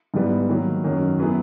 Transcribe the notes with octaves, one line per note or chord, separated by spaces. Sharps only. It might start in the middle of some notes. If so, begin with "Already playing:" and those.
G#2 E3 G3 B3
D#3 F#3 A#3
F#2 D#3 F#3
F#3 B3 E4 G#4 B4